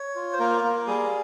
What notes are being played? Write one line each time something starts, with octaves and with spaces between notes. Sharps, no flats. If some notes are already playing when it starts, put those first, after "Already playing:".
Already playing: C#5
F4
C5
A#3 A#4
A#3
G3 G#4